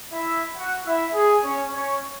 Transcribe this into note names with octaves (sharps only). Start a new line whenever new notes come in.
E4 E5
F#4 F#5
E4 E5
G#4
C#4 C#5
C#4 C#5